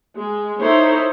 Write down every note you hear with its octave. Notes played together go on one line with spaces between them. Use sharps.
G#3
D#4 E4 A4 C5 C#5